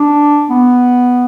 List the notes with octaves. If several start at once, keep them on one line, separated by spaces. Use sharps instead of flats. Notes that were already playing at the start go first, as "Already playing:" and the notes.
Already playing: D4
B3